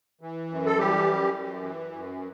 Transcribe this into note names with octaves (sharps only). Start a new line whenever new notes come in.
E3
F#2
A4
E3 G3 G4
F#2
F#2
E3
F#2